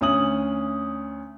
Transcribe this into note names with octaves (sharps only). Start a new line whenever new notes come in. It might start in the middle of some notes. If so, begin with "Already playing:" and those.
D2 C#4 D#6 F#7